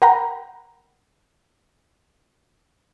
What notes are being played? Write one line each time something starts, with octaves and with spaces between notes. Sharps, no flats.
A#4 F#5 G5 A#5 B5